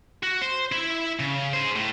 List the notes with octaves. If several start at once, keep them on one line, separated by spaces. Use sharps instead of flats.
F#4
C5
E4 E5
C#3
G#4 C5
A2